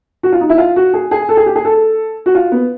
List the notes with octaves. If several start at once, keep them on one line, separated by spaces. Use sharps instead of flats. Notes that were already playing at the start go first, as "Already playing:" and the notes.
F#4
F4
D#4
E4
F4
F#4
G#4
G#4
A4
G#4
G4
G#4
A4
F#4
F4
B3